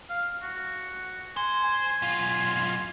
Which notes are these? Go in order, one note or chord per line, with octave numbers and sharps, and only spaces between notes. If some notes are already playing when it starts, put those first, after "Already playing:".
F5
F#4
C5 G#5
G#5
B1 F4
G#5